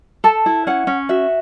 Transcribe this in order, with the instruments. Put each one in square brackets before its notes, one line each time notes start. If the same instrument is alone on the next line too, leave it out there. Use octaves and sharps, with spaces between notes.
[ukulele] A4 A5
E4
C#4 F#5
C#4
F#4 E5